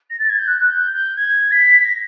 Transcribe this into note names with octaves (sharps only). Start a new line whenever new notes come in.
A#6
A6
G#6
G6
F#6
G6
G6
G#6
B6
A#6